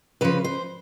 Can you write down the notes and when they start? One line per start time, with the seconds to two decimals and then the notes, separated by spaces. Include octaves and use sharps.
0.21 C#3 F3 B4
0.44 C5